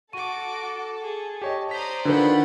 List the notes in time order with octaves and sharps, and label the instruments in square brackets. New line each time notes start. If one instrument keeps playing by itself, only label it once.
[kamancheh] F#4 D6 [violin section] A4 [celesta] C#6 D#7
[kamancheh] G#4
[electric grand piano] G4 C#5 D#5 [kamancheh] A5
[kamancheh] C5 D5 [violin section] A#5 D#6 [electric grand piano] B6
[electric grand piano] D3 D#3 [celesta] D4 F#4 B4 [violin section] F4 F#5 B5